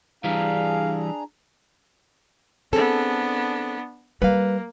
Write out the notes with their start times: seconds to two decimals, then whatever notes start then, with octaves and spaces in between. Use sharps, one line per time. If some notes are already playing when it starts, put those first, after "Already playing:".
0.24 E3 G3 D4 G#4 F5 A#5
2.73 B3 C4 D4 G#4 A4
4.22 G3 A#3 B4 F5